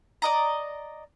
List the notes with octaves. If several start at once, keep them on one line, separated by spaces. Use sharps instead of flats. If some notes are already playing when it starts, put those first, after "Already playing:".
D5 D#5 A#5